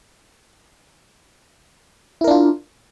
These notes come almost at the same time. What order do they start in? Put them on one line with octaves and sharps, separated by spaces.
E4 A#4 D4 F4